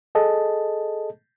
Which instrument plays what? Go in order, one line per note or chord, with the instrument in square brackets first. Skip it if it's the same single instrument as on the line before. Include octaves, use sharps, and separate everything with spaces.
[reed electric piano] G#4 A4 D#5 A5